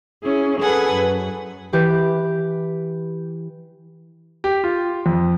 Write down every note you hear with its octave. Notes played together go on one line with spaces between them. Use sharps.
C#4 E4 G#4
G#4 A4 B4 F#5 G#5
F#2
E3 G4 B4
G4
F4
F2